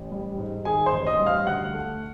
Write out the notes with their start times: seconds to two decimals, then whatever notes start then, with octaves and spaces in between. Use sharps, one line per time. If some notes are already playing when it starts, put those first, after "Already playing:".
Already playing: A1
0.12 G3
0.38 G#2
0.65 D#3 G#4 G#5
0.86 C5 C6
0.93 A1
1.06 D#5 D#6
1.20 G3
1.26 F5 F6
1.47 D2 F#5 F#6
1.74 A3